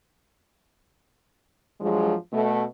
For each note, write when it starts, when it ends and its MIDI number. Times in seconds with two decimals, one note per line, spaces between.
1.80 2.14 43
1.80 2.14 53
1.80 2.14 54
1.80 2.14 56
2.32 2.65 47
2.32 2.65 57